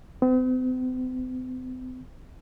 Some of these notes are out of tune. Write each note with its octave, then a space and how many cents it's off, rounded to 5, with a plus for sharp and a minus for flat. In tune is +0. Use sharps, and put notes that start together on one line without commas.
C4 -45